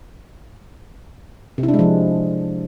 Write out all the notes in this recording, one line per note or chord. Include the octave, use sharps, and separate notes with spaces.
C3
E4
D4
G#3
F3